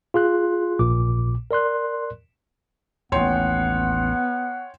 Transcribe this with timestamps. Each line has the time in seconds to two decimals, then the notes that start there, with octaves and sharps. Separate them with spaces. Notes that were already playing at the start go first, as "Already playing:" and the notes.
0.14 F4 G#4 C6 F#6
0.79 A#1 A#2 D6
1.51 A#4 D5 C6 F#6
3.12 A1 D#2 B3 C#5 F#5 G5 C6